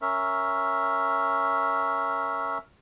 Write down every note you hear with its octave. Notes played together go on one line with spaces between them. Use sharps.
C#4 A#4 E5